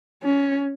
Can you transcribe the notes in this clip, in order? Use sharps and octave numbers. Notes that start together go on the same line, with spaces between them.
C#4